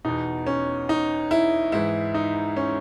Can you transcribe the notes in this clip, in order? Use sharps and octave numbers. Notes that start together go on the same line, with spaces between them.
E2 B2 D#4
C#4
D#4
E4
G#2 E3 E4
D#4
C#4